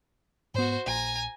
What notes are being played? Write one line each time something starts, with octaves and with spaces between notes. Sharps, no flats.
G#2 B3 F#4 C5
A#1 G#5 A#5